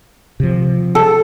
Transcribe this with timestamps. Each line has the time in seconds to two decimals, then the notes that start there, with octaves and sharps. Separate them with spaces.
0.40 C3 F3
0.95 A4